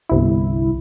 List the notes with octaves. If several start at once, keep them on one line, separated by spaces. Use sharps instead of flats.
G1 C2 E4